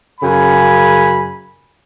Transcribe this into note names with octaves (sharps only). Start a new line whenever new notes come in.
F#2 C#3 G#5 B5